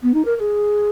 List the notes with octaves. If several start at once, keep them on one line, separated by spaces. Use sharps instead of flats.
B3
D#4
A#4
A#4
G#4